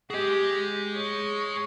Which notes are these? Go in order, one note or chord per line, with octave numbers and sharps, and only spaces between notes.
G4 G#4 D#5
C#5